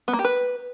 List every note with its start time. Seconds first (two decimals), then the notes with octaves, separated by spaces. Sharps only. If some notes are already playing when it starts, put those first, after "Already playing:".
0.08 B3
0.13 A#3
0.19 G4
0.24 B4